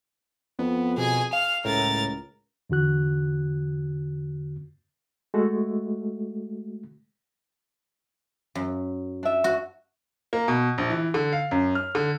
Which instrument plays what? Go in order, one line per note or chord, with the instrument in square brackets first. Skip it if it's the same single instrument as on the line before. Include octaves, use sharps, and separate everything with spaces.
[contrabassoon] F2 [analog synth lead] B3
[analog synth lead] B2 [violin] G#4 G#5
[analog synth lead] F5 [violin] F7
[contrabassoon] C#2 [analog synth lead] A2 [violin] A#4 A6
[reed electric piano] E2 D3 F#4 F#6
G#3 A3 F#4 A4
[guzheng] F#2
[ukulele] D4 E5
[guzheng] F#4
[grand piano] A#3
B2
A#1
E3
D3
F5
F#2
F6
D3